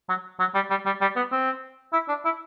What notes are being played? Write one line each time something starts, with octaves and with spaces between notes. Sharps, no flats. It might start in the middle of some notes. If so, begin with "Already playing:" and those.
F#3
F#3
G3
G3
G3
G3
B3
C4
E4
D4
E4